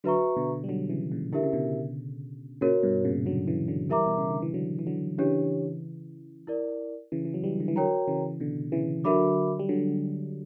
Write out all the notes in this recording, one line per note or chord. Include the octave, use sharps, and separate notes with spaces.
D3 F#3 F#4 B4 E5 A#5 C#6
B2 D3
G3
D3 F#3
F#3
C#3 E3
A#2 C#3
D3 E4 G4 A#4 E5
C#3
B2 D3
A#2 C#3 F#4 A#4 C#5
G2 B2
A#2 C#3
D3 F#3
C#3 E3
D3 F#3
E3 G3 A#4 E5 A#5 D6
B2
C#3
D3
E3
D3 F#3
E3
D3 F#3
C#3 E3 D4 G4 C#5
E4 A#4 D5
C#3 E3
E3
F#3
E3 G3
D3
E3
D3 F#3 F#4 A#4 C#5 G5 A#5
C#3 E3
B2 D3
C#3 E3
D3 F#3 F#4 A#4 E5 B5 D6
G3
D3 F#3